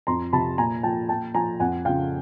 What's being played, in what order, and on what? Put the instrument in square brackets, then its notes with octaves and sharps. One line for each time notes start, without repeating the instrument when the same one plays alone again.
[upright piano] F2 A#5 C6
C3 F3 A5 B5
A#2 G#5 A#5
F3 G5 A5
A#2 G5 A5
F3 G#5 A#5
F2 F#5 G#5
C#3 F3 F5 G5